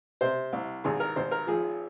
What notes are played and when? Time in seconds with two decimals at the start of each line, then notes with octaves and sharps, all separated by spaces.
0.21 C3 C5
0.53 C2
0.84 G#1 G#4
1.00 A#4
1.16 G#1 C5
1.31 A#4
1.47 F3 G#4